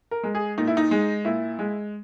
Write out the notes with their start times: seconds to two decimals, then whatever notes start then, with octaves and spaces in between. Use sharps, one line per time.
0.11 A#4
0.23 G#3
0.35 G#4
0.58 A#2 D#4
0.67 E4
0.77 D#4
0.91 G#3
1.25 A#2 E4
1.59 G#3